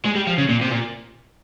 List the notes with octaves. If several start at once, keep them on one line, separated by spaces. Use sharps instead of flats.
G#3
G3
F3
C#3
A#2
C3
A#2